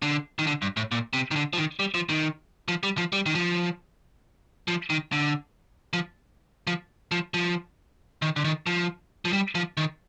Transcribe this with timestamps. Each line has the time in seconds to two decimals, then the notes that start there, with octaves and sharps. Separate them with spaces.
0.02 D3
0.39 D#3
0.47 D3
0.62 G2
0.77 A2
0.92 A#2
1.13 C3
1.31 D#3
1.36 D3
1.53 F3
1.58 D#3
1.80 G3
1.94 F3
2.09 D#3
2.68 F3
2.83 G3
2.98 F3
3.13 G3
3.26 D#3
3.35 F3
4.68 F3
4.90 D#3
5.12 D3
5.93 F3
6.67 F3
7.12 F3
7.34 F3
8.22 D#3
8.36 D3
8.45 D#3
8.66 F3
9.25 F3
9.33 G3
9.55 F3
9.77 D#3